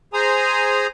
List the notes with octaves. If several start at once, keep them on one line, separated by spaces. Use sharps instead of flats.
G#4 C5 G#5 A#5 D#6